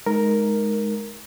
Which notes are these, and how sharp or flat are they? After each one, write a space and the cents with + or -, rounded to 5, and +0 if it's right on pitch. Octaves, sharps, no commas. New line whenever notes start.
G#3 +15 D#4 +0 A#4 +0